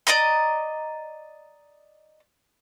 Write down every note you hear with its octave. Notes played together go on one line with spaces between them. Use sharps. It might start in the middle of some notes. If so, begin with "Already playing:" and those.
D5 D#5 A#5 D#6